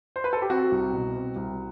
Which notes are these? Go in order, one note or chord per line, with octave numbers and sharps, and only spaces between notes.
C5
B4
A4
G4
C4 F#4
C2
B2
C4
C2